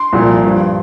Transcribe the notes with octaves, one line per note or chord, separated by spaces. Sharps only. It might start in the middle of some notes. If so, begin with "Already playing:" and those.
Already playing: C6
C2 A#2 F3
G2 F3